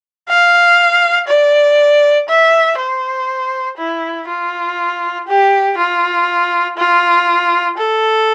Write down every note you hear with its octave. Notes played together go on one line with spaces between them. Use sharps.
F5
D5
E5
C5
E4
F4
G4
F4
F4
A4